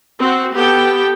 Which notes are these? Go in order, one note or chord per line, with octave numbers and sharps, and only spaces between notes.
C4 F#4
B3 G4 A4 G5